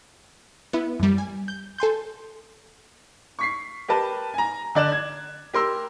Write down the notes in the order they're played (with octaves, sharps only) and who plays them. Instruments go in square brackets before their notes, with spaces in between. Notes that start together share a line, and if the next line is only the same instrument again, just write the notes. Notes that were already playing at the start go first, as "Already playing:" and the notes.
[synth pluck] B3 E4
F#2 G3
G#5
G6
A4 G#5 C6 G6
[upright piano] C#6 B6 C7
G4 A#4 B4 A5
G#5 A#5
D3 D5 F#6 E7
G#6
G4 A#4 C6 E6